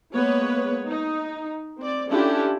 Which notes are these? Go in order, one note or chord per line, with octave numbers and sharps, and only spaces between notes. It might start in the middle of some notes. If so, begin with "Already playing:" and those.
G#3 A#3 B3 B4 C#5
D#4
C4 D5
C#4 D4 E4 F4 G4 A4